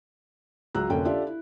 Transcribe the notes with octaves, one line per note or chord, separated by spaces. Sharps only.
C#2 F#3 A#5 E6 F#6
F1 B2 D3 A#3 C#4 G5
D4 F4 G4 A4 D5 E5
E4